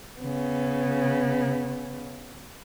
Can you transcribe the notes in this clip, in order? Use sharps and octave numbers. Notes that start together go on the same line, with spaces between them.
C#3 B3